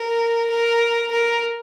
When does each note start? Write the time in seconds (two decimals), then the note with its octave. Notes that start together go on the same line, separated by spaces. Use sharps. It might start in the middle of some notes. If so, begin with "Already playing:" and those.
Already playing: A#4
0.50 A#4
1.12 A#4